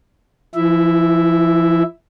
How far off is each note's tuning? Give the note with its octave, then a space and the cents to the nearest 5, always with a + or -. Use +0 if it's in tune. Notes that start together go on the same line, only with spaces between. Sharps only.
F3 -35 E4 +0 E5 +0